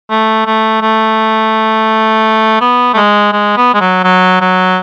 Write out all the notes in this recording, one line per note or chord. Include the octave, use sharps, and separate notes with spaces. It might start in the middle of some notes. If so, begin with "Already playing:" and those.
A3
A3
A3
B3
A3
G#3
G#3
B3
G#3
F#3
F#3
F#3